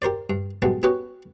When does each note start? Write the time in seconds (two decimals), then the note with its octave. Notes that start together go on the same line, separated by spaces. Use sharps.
0.02 G4 A#4 C5 D5
0.30 G2
0.62 B1 B2 G3 G#3 B3
0.83 B3 C#4 F#4 G4 B4